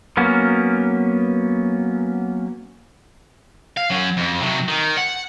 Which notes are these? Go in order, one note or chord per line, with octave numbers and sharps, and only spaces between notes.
F#3 A#3 B3 C#4
F5
F#3 C#4
F2
C3 F#3
D#3
F#5